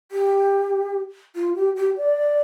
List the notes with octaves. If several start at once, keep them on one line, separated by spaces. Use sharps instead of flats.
G4
F4
G4
G4
D5